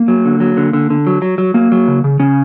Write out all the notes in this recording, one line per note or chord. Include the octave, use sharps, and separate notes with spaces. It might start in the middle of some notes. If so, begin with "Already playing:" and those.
Already playing: A#3
F#3
D3
F#3
D3
D3
D3
F#3
F#3
F#3
F#3 A#3
F#3
C#3
C#3
C#3 C#4